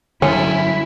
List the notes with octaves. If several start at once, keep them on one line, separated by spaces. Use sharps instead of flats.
G2 D3 F#3 C#4 E4